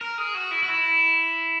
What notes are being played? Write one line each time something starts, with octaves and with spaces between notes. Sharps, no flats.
A#4
G#4
F#4
E4
F#4
E4